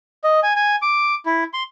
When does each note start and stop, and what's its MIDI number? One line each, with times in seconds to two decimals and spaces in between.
0.24 0.40 75
0.43 0.53 80
0.56 0.76 80
0.82 1.15 86
1.26 1.44 64
1.53 1.63 84